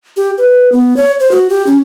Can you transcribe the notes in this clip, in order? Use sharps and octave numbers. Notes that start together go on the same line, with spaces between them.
G4
B4
B3
C#5
C5
F#4
G4
C#4